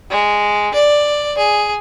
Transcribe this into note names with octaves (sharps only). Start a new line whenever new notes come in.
G#3
D5
G#4